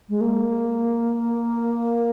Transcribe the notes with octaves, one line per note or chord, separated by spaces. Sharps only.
G#3
A#3